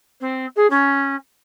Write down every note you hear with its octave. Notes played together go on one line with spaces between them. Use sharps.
C4
G#4
C#4